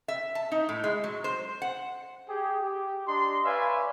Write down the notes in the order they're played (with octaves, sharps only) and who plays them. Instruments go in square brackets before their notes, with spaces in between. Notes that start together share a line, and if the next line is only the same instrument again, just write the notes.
[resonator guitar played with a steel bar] E5
A5
D#4
A2
G#3
F#3
C5
F#5
[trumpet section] G4 G#4 G5
G4
D4 D#5 A#5 C6
B4 C#5 D5 E5 F5 G#5